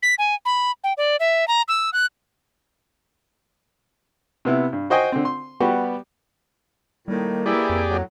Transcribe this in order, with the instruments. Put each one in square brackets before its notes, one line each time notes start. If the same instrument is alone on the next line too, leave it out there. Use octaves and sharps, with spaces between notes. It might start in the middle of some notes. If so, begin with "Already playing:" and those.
[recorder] B6
G#5
B5
G5
D5
E5
A#5
E6
F#6
[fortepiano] C3 B3 E4
G2
F#4 C5 D#5 G5 G#5
D3 C4
C6
G3 B3 F#4 G4
[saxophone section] A2 D#3 [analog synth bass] G3 [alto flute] A#3
[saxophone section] E3 E4 [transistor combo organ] G4 G#4 D5
[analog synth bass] F2
[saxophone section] A2 F#3